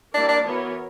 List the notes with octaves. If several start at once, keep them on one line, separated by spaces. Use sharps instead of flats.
G3 A#3 D4 E4 A#4 D5
D4
E3 B3 F#4 A#4 C#5